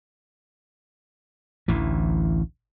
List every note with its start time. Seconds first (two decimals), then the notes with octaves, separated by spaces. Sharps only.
1.68 A1 D2 E3